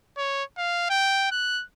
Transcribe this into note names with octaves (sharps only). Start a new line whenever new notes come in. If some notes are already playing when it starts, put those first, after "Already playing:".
C#5
F5
G5
F#6